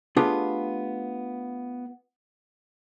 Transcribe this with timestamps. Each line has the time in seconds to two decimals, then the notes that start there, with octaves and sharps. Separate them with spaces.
0.16 A3 B3 D4 F4 G4 G#4